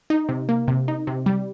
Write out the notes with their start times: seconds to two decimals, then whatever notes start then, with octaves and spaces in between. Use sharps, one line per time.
0.10 D#4
0.29 C3
0.49 A#3
0.68 C3
0.88 D#4
1.07 C3
1.26 G3